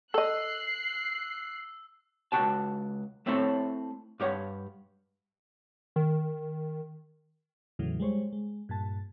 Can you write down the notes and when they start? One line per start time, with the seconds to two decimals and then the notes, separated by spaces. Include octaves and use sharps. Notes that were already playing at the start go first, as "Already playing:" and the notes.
0.14 A4 D#5 E6 F#6 C7
2.32 C#2 G2 F#4 G5 A5
3.26 A3 C4 E4 A4 C#5
4.20 G2 G4 C#5 F#5
5.96 D#3
7.79 E2 A2 C#3 E3 F#3
8.00 G3 G#3 C5 C#5
8.32 G#3
8.69 G2 A#2 A5